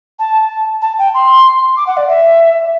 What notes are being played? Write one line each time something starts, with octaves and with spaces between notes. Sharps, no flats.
A5
A5
G5
C6
D6
F#5
D5
E5